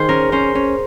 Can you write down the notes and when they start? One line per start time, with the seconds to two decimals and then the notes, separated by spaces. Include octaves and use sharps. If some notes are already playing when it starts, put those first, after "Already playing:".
Already playing: D#3 G#4 C5
0.09 C#4 A#4
0.32 C#4 C5
0.55 C#4